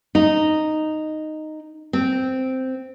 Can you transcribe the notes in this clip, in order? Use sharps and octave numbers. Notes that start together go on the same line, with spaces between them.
D#4
C4